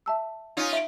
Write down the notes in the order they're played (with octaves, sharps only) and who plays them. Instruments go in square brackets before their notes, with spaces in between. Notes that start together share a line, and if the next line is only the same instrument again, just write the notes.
[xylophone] E5 A5 E6
[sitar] C#4 D#4 F4
[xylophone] E5 D7